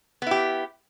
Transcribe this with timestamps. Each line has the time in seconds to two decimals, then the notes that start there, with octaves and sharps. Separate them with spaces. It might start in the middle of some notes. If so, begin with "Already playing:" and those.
0.22 B3
0.27 E4
0.31 G4